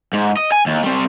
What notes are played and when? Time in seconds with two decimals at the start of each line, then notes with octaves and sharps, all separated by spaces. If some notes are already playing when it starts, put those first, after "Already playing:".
0.13 G#2
0.37 D#5
0.52 G#5
0.66 D#2
0.83 G3 C4